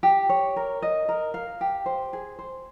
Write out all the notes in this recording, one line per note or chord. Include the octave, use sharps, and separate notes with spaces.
G4
C#5
A#4
D#5
A#4
F5
G4
C5
G#4
C5